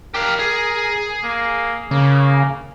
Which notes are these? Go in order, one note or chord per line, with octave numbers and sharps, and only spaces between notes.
G4 A#4 F5
G#4
A#3
C#3 A#3